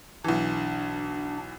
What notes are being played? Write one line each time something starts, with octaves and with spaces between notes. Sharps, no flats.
B1 E3 D4